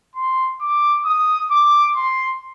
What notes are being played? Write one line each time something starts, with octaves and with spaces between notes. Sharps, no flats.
C6
D6
D#6
D6
C6